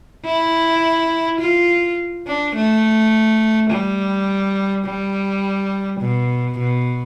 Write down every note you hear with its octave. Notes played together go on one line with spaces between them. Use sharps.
E4
F4
D4
A3
G3
G3
B2
B2